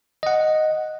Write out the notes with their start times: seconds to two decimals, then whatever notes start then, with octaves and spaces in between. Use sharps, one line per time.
0.23 D#5 F#5